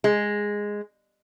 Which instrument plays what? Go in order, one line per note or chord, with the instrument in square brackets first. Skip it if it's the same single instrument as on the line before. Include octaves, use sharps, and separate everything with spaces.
[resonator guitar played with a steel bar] G#3